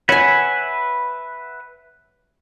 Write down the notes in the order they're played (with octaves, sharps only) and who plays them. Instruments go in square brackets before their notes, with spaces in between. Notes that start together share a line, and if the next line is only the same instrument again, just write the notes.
[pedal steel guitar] B4 E5 F#5 [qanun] C#5 G#5